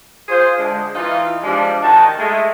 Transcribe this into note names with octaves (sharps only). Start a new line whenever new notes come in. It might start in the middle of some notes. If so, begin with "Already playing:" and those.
F4 G#4 C5
D3 G#3
E3 D#4 F4
F3 G3 G#3 D4
D#3 F#4 G5 A5
G#3 A3